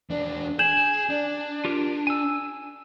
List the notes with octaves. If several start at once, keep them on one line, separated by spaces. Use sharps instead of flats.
E2 D4
G#4 G6 G#6 E7 F#7
D4
F4 G4 A#4
G#5 E6